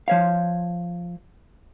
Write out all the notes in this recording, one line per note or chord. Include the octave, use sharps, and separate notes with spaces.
F3 C#5 F5